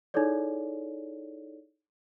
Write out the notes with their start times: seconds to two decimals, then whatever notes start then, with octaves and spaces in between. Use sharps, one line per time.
0.14 D#4 E4 G#4 A4 C#5 D5